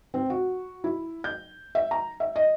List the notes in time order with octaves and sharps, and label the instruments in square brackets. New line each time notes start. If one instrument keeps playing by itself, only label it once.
[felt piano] C4
F#4
E4
G6
E5
A#5
E5
D#5